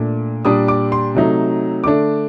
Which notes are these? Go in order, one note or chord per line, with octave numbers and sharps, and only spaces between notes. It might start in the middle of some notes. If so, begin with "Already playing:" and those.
Already playing: A#2 A3 D4
A#2 G3 D4 D#6
D6
C6
C3 F#3 A3 D#4
D3 A3 D4 D6